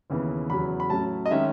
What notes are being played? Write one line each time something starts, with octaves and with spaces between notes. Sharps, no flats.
D#2 C#3 E3 B3
E2 C#3 F#3 B5
B5
A2 F#3 C#4 A5
D#5
D#3 G#3 C#4 E5